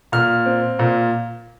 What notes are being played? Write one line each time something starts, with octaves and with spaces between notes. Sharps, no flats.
A#2 F6
C4
A#2